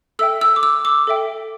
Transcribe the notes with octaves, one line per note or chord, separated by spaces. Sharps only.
A4 E5 G5 E6
E6
D6
E6
D6
A4 E5 G5